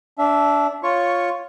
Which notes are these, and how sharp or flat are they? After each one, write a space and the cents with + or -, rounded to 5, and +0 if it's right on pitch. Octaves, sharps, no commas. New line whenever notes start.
D4 -20 E5 +0
F4 +5 C#5 +0 C#6 -5